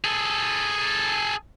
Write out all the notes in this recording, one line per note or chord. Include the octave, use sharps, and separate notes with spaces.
G#4 A4